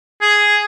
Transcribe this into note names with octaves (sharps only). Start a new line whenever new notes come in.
G#4